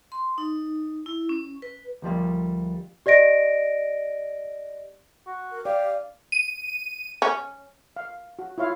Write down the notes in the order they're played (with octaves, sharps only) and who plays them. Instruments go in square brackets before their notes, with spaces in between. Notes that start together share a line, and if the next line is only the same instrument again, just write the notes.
[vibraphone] C6
D#4
E4
C#4
B4
[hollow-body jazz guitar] D2 F3 G3 A#3
[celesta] G4 D5 D#5 A#6 D7
[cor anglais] F#4
[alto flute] A#4
[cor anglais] G4 [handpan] D5 [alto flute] F5
[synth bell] D#7
[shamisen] C#4
[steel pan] F5
F#4
E4 F4 C#5 F5